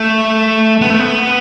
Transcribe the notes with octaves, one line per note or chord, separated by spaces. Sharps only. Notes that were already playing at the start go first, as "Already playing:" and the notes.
Already playing: A3
B3
A3
B3